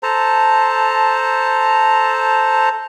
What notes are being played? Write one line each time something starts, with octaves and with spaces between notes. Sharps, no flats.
A4 C5 A5 A#5